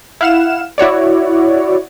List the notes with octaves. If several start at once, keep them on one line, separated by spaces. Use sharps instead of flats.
E4 F5 F#5 F6 E7
E4 F#4 C#5 D5